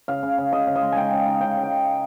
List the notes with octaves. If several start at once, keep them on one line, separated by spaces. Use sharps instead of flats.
C#3 F5
C#3
C#3
C#3 D#5
C#3
D#5
G#3
D#4 G5 G#5
C#3
D#4
C#3 G5
C#3
G5
D#4